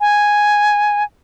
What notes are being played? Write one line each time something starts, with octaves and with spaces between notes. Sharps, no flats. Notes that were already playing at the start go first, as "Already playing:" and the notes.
G#5